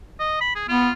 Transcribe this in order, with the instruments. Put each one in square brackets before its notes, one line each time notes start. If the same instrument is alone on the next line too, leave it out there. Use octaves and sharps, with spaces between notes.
[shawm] D#5
B5
G#4
[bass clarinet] B3 [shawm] F4